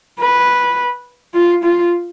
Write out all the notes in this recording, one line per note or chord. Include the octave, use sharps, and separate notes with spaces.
B4
F4
F4